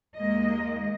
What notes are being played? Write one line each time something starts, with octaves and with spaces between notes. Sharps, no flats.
D#2 G#3 A#3 D#5